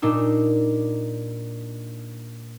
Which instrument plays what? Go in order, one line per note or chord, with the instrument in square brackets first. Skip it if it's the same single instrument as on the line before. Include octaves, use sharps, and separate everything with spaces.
[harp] A#2 D4 D#4 E6